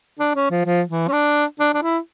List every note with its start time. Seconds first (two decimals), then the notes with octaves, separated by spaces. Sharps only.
0.20 D4
0.35 C#4
0.51 F3
0.66 F3
0.89 E3
1.08 C#4
1.13 D4
1.60 D4
1.74 D4
1.82 E4